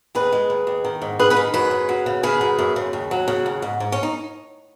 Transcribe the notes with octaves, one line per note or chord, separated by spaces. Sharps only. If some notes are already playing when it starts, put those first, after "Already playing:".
D#2 G#4 B4
G#3
D#2
D#2
D#3
G#2
D#3 G#4 B4
G#4 B4
D#3
F#2 G#4 B4
C#3
F#3
C#3
C#3 G#4 B4
F#2
F#2
C#3
D#2
F#3
C#3
D#2
G#2
G#2
C#4
D#4